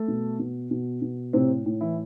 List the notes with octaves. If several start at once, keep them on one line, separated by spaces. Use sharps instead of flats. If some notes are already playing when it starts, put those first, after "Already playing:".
Already playing: A3 A4
B2
B2
B2
B2
A2 C3 C4
A2
E3 E4